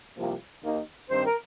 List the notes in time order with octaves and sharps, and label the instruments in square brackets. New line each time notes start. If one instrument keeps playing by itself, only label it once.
[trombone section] C2 C3 F3 A#3 F4
D#2 D#3 A#3 D#4
[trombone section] G2 D#3 C4 [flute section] C5
[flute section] A#4